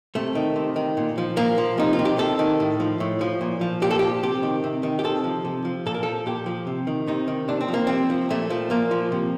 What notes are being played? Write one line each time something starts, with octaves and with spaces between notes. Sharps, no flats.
C3 A3
D#3
C3
D#3
A#2
F3
A#2 A#3
F3
C3 D#4
F4
D#3
G4
C3 A4
D#3
A2
F3
A2
F3
A#2
F3
A#2 G4
A4
F3 G4
C3 G4
D#3
C3
D#3
G4
C3 A4
F3
C3
F3
A#2 A4
A#4
F3 A4
A#2 G4
F3
C3
D#3
C3 D#4
D#3
C3 D4
C4
F3
A#3
C3 C4
F3
A#2 A3
F3
A#2 A#3
F3
C3